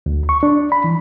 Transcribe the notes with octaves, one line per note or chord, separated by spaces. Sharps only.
D2
C#6
D4
B5
E3